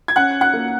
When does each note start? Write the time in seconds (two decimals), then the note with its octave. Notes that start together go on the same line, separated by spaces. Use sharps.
0.08 G#6
0.16 C#4 F#5 F#6
0.41 F#5 F#6
0.53 A#3